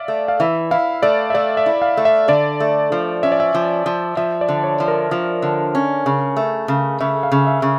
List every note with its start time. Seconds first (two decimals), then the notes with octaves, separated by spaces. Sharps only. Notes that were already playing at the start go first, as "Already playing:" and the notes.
Already playing: D5 E5 F5
0.08 A3
0.28 F5
0.40 E3 E5
0.71 E4 F5
1.02 A3 D5
1.30 E5
1.34 A3 D5
1.57 E5
1.66 E4
1.82 F5
1.97 A3
2.05 E5
2.28 D3 D5
2.60 A3
2.92 F3
3.23 C#4 E5
3.32 D5
3.40 E5
3.54 F3
3.86 F3
4.17 F3 E5
4.41 D5
4.48 D3
4.64 C#5
4.80 F3
4.88 A#4
5.11 F3
5.42 D3
5.75 C#4
6.06 C#3
6.36 A3
6.68 C#3
7.00 C#3 E5
7.23 F5
7.32 C#3
7.47 E5
7.62 C#3